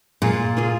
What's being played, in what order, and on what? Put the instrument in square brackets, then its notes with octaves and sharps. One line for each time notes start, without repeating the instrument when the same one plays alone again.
[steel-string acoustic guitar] A#2 [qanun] A#3 F4 G#4
[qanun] A#3 F4 G#4